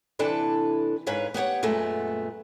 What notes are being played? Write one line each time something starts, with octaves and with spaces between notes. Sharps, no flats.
C3 E3 D4 A4 B4
G#2 B4 C#5 F5
B3 G4 C#5 F#5
F#2 A#2 G#3 A3 B3